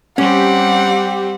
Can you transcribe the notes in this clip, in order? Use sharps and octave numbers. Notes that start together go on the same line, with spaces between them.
G3 C4 C#4 G4 F#5